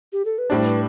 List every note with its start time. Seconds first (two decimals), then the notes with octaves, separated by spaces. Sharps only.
0.13 G4
0.25 A4
0.38 B4
0.50 A2 G3 D4 C5
0.66 B4